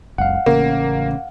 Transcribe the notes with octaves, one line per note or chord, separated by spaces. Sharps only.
F#1 C#2 F5 F#5
A1 C#3 A#3